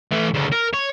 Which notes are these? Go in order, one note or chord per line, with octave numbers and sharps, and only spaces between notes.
E3 A3
D2 C#3
A#4
C#5